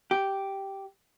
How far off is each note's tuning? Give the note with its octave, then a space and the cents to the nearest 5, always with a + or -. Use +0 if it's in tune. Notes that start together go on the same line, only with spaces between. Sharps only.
G4 -5